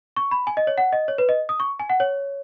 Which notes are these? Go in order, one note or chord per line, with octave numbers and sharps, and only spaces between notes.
C#6
B5
G#5
D#5
C#5
F#5
D#5
C#5
B4
D#5
D#6
C#6
G#5
F#5
C#5